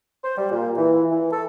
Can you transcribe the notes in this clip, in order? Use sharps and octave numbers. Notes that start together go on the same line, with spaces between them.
C5
G3
A#2
E3
E3
A4